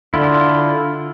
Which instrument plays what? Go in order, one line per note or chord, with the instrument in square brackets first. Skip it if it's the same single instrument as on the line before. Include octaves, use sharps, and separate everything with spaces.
[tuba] D3 [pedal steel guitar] E4 F4